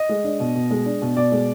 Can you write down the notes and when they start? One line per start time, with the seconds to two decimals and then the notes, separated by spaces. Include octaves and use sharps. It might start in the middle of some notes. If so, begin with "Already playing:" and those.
Already playing: D#5
0.09 G#3
0.24 D4
0.40 B2
0.55 B2
0.71 G#3
0.86 D4
1.02 B2
1.16 B2 D5
1.32 G#3